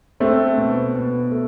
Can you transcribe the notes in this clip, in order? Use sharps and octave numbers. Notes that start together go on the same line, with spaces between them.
A3 C4 D4
B2
B2
A3